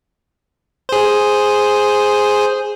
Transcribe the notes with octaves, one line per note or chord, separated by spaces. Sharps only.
G#4 C5